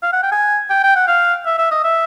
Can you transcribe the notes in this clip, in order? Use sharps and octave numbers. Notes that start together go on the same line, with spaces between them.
F5
F#5
G5
G#5
G5
G5
F#5
F5
E5
E5
D#5
E5